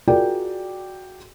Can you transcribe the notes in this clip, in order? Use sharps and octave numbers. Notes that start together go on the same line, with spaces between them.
F4 F#4 G#4 A#4 D5 G5